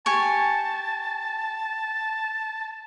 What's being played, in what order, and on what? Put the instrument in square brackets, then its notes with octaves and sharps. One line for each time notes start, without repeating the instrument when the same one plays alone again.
[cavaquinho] G4 G#5 C#6 [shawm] A5